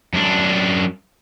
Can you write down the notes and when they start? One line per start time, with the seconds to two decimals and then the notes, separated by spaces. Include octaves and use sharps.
0.14 F#2 D4